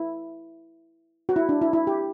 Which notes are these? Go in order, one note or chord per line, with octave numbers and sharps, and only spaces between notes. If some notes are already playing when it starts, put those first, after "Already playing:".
Already playing: E4
F#4
E4
D4
E4
E4
G4